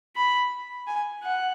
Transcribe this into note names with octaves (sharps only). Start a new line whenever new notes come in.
B5
G#5
F#5